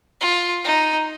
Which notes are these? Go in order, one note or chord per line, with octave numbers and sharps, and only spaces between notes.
F4
D#4